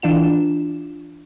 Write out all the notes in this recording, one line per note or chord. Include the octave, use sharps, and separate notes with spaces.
E3 D4 F4 E7